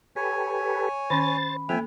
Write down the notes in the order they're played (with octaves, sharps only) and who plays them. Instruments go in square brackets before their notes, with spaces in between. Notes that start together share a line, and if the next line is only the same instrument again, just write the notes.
[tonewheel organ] G4 A4 B4 [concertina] C#5 G#5
[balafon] D#3 C#4 [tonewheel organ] C5 A6 [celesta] B5
[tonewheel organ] F3 C4 [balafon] A#3 A4 [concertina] E5 G5 G#5